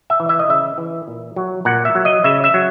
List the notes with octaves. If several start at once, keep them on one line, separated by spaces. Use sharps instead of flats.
E5
E3
E5
D#5
C#3 E5
E3
A#2
F#3
A#2 F#5
E5
F#3
D#5
C#3 E5
E5
F#3